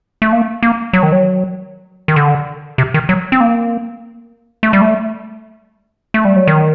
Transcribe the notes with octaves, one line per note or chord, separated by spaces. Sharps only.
A3
A#3
A#3
F#3
D#3
F#3
D#3
D3
C3
D#3
F#3
C4
A#3
A3
G3
A3
A3
G3
F#3
D#3